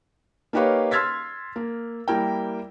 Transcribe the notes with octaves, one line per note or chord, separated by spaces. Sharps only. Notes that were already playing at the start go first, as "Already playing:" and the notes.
A#3 D#4 G4 B4 C#5 F5
C6 E6 F6 G#6 A6 B6
A#3
G3 A#3 E4 A#4 G5